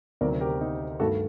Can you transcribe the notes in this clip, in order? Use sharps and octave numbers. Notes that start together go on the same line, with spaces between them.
D2 C3 D#3 F#3 A#4 D5
G4 A#4
D#4 G4
G2 D#3 A3 F#4 A4